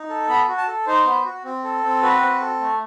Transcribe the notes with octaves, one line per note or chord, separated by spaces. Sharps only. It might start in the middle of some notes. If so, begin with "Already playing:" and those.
Already playing: D#4
A4
B3 B5
F#4
A5
A4
D#4 C5
B3
F#4
C4
A4
C4
F#4 B4
C4
A4
A3